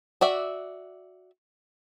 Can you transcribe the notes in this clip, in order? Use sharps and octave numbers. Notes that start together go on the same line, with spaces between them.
F#4 D5 E5